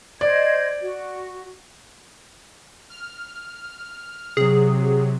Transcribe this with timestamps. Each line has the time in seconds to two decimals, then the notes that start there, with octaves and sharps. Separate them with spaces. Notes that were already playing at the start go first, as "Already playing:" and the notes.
0.21 C5 D5 D#5 G#6
0.82 F#4
2.90 F6
4.37 C3 F#3 G#4